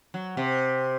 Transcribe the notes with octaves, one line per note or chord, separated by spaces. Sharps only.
F#3
C3